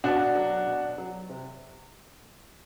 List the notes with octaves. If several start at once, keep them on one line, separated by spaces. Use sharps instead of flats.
B2 D4 F#4
F#3
B2
F#3
C3